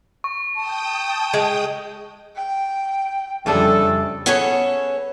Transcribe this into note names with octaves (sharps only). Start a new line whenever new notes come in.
C#6
G5 A5 D#6
G#3
G5
F2 C#3 G3 A3 D4 G#4 A4
B3 C#4 G#4 A4 C#5